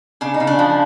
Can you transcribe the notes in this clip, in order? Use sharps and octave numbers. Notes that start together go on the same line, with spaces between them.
C#3 D4
D#4
C#3
D4
F3